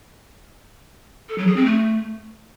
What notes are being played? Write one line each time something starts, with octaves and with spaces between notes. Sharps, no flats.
A4
F#3
G#4
C4
A3